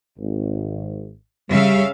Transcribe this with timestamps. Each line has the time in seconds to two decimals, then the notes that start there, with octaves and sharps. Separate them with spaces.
0.18 G#1
1.49 C#3 G3 E5 F5